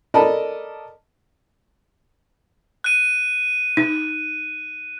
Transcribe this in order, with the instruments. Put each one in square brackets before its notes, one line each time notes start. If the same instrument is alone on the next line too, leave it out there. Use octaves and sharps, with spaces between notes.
[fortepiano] A4 A#4 D5 D#5 A5 B5
[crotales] F#6 D#7
[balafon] D#4